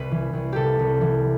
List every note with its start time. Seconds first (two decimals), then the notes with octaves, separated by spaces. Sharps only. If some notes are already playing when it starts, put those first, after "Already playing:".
Already playing: C2 B4
0.11 E3
0.33 C2
0.53 C3 G4 A4
0.79 C2
1.01 E3